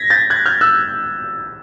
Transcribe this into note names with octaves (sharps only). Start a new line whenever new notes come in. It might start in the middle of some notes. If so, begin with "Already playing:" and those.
Already playing: G#6 A#6 B6
G6 A6
F#6 G#6
F6 G6
E6 F#6